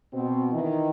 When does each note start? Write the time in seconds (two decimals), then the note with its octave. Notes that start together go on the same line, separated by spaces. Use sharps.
0.13 B2 C4
0.51 D#3 E3 D#4